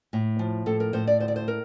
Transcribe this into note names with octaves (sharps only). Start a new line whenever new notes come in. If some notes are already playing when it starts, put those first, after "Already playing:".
A2
F3
A2 A4
A#4
A2 C5
D5
D2 C5
D5
C5
A#4